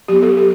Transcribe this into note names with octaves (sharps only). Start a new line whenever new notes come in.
F#3 B3 G4
A4
G4